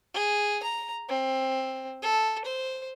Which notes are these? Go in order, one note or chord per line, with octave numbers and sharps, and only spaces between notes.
G#4
A#5
C4
A4
C5